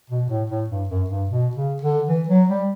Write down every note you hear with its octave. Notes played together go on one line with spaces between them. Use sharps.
B2
A2
A2
G2
F#2
G2
B2
C#3
D3
E3
F#3
G3